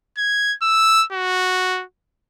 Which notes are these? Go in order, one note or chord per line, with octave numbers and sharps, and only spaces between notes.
G#6
E6
F#4